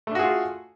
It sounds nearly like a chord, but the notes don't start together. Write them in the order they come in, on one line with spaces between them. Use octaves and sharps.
A3 D4 F#4 G#4 F4